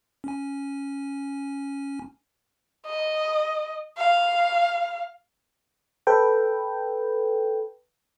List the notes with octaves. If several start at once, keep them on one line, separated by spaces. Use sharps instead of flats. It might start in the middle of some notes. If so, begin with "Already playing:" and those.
C#4 G#5
D#5
F5
A4 B4 G5